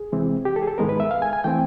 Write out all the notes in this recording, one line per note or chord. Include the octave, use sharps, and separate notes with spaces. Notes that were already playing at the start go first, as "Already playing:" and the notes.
Already playing: G#4
C3 E3 G#3 C4
G4
A4
G#4
A4
G#2 D#3 G#3 B3 A#4
B4
E5
F5
G#5
G#5
E3 A3 C4 G5